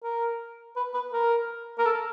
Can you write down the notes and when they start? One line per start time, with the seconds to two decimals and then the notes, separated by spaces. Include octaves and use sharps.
0.03 A#4
0.76 B4
0.94 B4
1.13 A#4
1.78 A#4
1.85 A4